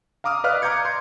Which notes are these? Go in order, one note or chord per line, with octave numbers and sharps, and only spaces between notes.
F5 A#5 D6 D#6 F6
B4 D5 D#5 F5 F6 F#6
F5 A#5 D6 G6 G#6 C#7
C6 G6